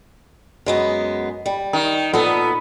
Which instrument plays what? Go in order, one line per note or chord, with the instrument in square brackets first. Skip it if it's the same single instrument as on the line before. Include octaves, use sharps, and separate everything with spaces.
[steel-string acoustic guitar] F#2 G#3 B3
G3
[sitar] D#3
[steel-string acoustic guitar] A#2 A4 [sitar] B3